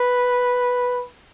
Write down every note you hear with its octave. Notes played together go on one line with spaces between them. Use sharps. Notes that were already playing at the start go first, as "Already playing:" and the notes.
Already playing: B4